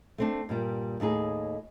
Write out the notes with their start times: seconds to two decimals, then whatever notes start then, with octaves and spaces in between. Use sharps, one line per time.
0.18 A3 C4 D4
0.49 G2 A#2 G3
1.00 D#2 A2 D#4 G#4